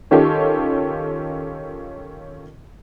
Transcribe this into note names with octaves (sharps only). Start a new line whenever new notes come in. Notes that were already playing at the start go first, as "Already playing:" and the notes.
D#3 C#4 F4 G4 A4